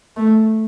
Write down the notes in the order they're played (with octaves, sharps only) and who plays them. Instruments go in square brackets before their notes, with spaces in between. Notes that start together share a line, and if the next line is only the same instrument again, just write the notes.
[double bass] A3